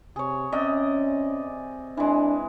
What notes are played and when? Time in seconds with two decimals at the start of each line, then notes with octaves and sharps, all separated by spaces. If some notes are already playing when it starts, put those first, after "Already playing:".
0.16 C3 G#4 C#5
0.52 C3 C#4 D5 D#5
1.97 E3 G#3 D4